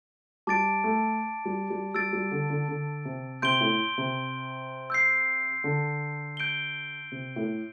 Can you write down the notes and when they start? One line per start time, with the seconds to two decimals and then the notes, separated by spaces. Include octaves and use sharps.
0.47 G3 A5 D6 A6 D7
0.84 A3
1.45 G3
1.70 G3
1.94 G3 E6 A6 D7
2.13 G3
2.31 D3
2.50 D3
2.68 D3
3.05 C3
3.42 C3 C6 G6 D7 G7
3.60 A2
3.98 C3
4.90 E6 G6 C7
5.64 D3
6.37 G6 D7 G7
7.12 C3
7.36 A2